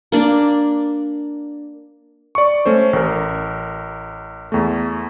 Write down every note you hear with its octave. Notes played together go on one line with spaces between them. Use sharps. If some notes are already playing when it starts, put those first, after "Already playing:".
A#3 D4 D5
D5 C#6
A3 C#4 C5
A1 A#4
E2 A3